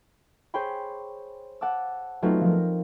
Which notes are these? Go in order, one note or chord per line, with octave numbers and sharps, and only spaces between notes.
G#4 C5 C#5 G5 B5
F#5 A5 D6 E6
F#3 A3 B3 C4 D#4 F4
F3 A#4